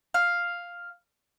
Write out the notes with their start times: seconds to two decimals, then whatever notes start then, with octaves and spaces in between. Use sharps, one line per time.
0.14 F5